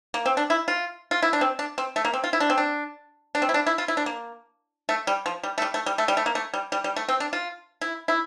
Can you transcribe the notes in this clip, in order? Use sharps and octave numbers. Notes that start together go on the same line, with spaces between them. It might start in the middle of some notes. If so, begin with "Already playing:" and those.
A#3
C4
D4
E4
F4
F4
E4
D4
C4
D4
C4
A3
A#3
C4
F4
E4
D4
C4
D4
D4
C4
E4
D4
E4
F4
E4
D4
A#3
A3
G3
F3
G3
A3
G3
A3
G3
A3
G3
A3
A#3
A3
G3
G3
G3
A3
C4
D4
F4
E4
E4